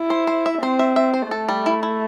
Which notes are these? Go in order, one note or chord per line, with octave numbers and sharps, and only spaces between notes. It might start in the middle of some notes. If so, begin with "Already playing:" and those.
Already playing: E4
C5
C5
E5
C4 C5
E5
E5
C5
A3 A4
G3
E4
E4